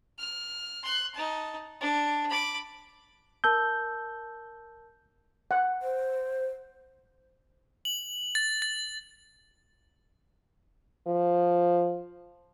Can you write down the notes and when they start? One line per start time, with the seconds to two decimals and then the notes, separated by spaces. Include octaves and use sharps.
0.18 F6
0.83 C6 F#6
1.14 D#4 A5
1.81 D4
2.29 B5 D6
3.44 A#4 A5 E6 G6
5.51 F#5
5.82 C5
7.85 F#7
8.35 A6
8.62 A6
11.07 F3